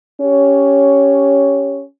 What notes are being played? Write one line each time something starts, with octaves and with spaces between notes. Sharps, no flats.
C#4 G4 C#5